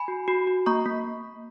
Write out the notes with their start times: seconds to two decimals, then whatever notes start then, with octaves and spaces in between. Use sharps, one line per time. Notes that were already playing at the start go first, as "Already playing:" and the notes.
Already playing: G#5 B5
0.08 F#4
0.28 F#4
0.47 F#4
0.66 A#3 A#5 C#6
0.86 A#3